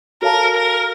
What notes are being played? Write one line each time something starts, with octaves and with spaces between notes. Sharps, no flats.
F#4 A4 A#4 C#5 F5 A5
A#4